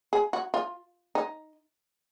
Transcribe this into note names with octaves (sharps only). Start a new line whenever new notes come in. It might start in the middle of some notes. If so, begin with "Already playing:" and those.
G#4
F#4
F4
D#4